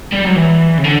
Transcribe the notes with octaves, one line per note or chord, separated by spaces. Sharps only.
G3
F#3
E3
C#3
D3